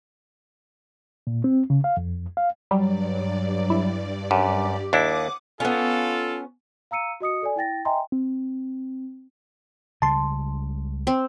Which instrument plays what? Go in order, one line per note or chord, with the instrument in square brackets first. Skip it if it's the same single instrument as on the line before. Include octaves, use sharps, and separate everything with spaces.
[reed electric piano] A#2
C4
C#3
F5
F2
F5
[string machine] G2 D5 [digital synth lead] F#3 [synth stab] G3
[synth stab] E4
[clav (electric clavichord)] F#2 [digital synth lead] G4
[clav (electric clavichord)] D#2 D4 E4 [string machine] F#5 D#6 [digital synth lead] D6
[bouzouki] B3 C#4 [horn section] F4 A4
[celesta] F5 A#5 E6 C#7 D#7
F#4 D#5 D#6 C#7
A4 D5 G#5
E4 G5 A6 A#6
D#5 E5 G5 G#5 A#5 C6
[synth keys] C4
[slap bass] C#2 C#3 G3 [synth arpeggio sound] A5 C6
[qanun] C4